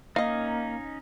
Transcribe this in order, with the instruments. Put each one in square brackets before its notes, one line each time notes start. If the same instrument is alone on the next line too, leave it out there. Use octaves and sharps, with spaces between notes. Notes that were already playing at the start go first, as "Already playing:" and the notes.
[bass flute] A#3 [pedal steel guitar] C#4 D#4 [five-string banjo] D#5 F5